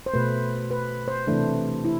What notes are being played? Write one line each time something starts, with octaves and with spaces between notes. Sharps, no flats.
C5
B2 A3 B4
B4
C5
C3 E3 A3 D4
E4